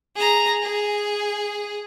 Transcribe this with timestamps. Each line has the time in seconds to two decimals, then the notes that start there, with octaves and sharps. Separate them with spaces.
0.16 G#4 A#5
0.62 G#4